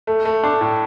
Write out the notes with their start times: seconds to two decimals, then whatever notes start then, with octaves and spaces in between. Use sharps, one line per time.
0.07 A3
0.25 A3
0.44 D4
0.61 A2